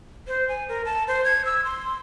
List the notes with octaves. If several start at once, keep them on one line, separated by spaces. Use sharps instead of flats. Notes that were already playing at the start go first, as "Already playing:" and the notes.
C5
G#5
A#4
A5
C5
G#6
E6
C6